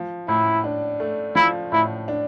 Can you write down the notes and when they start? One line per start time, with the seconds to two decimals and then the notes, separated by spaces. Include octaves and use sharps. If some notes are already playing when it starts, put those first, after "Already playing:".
Already playing: F3
0.28 A2 E4
0.64 D4
1.00 A3
1.35 F3 E4
1.72 A2 E4
2.08 D4